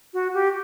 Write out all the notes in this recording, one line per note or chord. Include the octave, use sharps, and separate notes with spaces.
F#4
G4